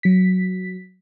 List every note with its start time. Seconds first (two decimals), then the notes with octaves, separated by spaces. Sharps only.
0.03 F#3 B6